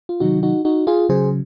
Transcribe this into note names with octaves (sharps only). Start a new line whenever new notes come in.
F4
C3 D#3 F#3 D#4 F#4
D#4 F#4
D#4 F#4
F4 G#4
C#3 F#3 G#4 C5